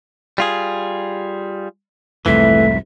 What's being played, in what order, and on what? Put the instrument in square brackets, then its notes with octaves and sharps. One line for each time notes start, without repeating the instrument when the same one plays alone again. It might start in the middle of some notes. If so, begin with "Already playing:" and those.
[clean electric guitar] G3 F4 G#4
[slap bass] C2 F2 G#2 [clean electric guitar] E3 [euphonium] A3 [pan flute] E5